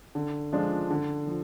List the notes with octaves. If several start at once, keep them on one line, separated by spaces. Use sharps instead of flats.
D3
F3 G#3 D4 F4
D3
F3